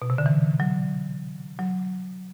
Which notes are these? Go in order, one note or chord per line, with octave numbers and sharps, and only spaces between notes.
B2
C3
D3
E3
F#3
F#3